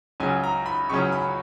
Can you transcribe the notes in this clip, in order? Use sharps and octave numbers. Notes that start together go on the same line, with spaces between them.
C#2 C#3 F#3 C#4 G#5
A#5
B5
C#2 C#3 F#3 C#4 C#6
B5